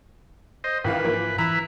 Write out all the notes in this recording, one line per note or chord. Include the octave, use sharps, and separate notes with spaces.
C5 D#5
D#2 G#2 E3 B4 F5
E3 F3 A#3
E3 E4 B4 A#5